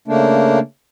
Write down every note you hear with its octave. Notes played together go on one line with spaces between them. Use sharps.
C#3 A3 A#3 D4